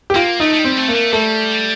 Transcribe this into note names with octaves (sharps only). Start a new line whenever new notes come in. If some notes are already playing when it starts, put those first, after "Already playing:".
G4
A#3 F4
A3 D#4
A3
G3
C4
A3
A#3
A3
G3 A3